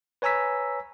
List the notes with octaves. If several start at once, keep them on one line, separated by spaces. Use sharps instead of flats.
B4 C#5 G#5 A#5 E6 B6